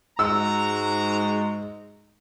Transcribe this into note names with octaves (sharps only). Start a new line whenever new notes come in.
G#2 G#3 F#4 A#5 E6